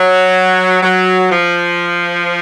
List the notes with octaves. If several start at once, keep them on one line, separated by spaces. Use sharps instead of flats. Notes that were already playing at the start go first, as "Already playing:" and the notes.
Already playing: F#3
F#3
F3